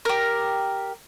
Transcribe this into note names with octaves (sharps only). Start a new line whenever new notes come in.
G4 A#4